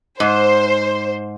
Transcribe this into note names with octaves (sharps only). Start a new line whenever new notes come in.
G#2 C5